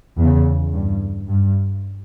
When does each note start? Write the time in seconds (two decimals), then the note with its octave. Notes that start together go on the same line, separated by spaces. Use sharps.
0.18 E2 C#3
0.73 G2
1.28 G2